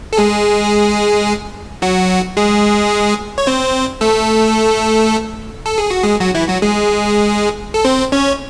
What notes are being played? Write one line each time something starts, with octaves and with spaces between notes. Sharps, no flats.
A4
G#3 G#4
F#3 F#4
G#3 G#4
C#5
C4 C5
A3 A4
A4
G#4
F#4
G#3 G#4
F#3 F#4
E3 E4
F#3 F#4
G#3 G#4
A4
C4 C5
C#4 C#5